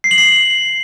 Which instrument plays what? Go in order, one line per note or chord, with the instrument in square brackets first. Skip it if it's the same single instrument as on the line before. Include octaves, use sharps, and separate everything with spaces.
[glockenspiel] C7
F#7
C7